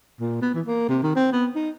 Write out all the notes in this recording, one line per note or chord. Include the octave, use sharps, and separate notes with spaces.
A#2
B3
E3
A#3
C3
D#3
C4
B3
D#4